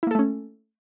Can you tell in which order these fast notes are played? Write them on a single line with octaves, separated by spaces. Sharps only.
E4 A#3 A4 A3 C#4